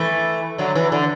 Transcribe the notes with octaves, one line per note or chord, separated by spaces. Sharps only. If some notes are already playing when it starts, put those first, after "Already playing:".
Already playing: E3 A3
D3 F#3
E3
D3